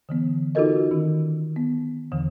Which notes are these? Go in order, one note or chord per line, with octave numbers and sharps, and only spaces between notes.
D3 E3 B3
D#4 F4 F#4 A4 A#4 D#5
D#3 C#4
B3
E2 D3 E3